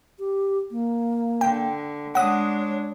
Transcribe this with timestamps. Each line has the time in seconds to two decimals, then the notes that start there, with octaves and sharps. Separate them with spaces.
0.19 G4
0.71 A#3
1.41 D3 G5
2.15 G#3 D4 C#5 F#5 D#6